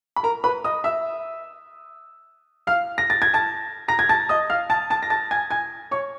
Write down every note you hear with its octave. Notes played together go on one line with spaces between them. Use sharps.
B5
A#4 A#5
B4 B5
D#5 D#6
E5 E6
F5 F6
A#6
A6
G#6
A5 A6
A#5 A#6
G#6
A5 A6
D#5 D#6
F5 F6
A5 A6
A5 A6
A#6
A5 A6
G#5 G#6
G#5 G#6
C#5 C#6